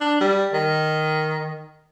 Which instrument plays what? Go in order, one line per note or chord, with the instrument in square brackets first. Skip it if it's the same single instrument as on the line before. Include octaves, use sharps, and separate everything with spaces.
[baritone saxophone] D4
G3
D#3